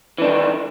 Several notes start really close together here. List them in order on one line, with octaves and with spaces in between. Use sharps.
E3 D4 D#3